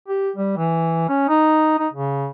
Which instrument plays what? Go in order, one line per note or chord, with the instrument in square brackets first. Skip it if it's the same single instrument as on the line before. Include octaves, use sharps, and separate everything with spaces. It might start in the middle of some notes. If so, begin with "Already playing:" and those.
[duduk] G4
G3
E3
C#4
D#4
D#4
C#3